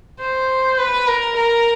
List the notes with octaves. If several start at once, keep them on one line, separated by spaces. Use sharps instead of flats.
C5
B4
A#4
A#4